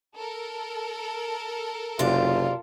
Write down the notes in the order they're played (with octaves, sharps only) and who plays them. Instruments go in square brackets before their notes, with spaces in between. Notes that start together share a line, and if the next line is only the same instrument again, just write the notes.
[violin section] A4 A#4
[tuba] F#1 [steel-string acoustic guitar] C3 D5 [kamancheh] F4